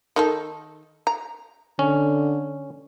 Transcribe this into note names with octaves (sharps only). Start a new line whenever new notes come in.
D#3 D#4 A4
A#5
D3 C#4